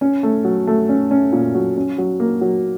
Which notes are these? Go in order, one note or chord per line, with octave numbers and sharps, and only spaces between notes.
C#4
A3
F#3
A3
C#4
C#4
A#2
F#3
C#4
F#3
A#3
F#3